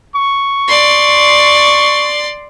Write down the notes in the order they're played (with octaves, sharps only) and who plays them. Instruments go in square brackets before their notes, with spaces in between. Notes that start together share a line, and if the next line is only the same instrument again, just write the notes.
[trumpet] C#6
[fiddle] D5 C6